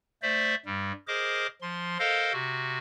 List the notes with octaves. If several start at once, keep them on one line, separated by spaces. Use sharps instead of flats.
A3 C5 D5 E5
G2 G3
G#4 A#4 C5 D#5 D6
F3 C6
A4 A#4 C5 D#5 F5
C3 F#4